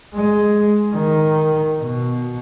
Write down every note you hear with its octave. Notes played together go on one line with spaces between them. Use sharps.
G#3
D#3
B2